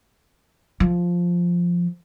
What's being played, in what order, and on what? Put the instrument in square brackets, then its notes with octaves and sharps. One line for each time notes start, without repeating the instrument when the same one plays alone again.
[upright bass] F3